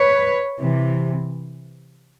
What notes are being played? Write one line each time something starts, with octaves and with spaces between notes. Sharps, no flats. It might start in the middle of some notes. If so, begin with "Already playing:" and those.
Already playing: B4 C#5
C3 E3